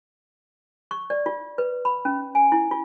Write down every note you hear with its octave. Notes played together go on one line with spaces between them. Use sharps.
C#6
D5
F4
B4
B5
C#4
G#5
E4
F4